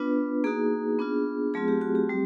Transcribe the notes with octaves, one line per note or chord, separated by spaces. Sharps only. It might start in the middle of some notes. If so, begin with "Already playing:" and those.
Already playing: B3 D4 F4 B4
A#3 D#4 F#4 G#4
B3 D4 F4
F#3 A3 C4 F4 G#4
G4
F#4
G4
G3 C4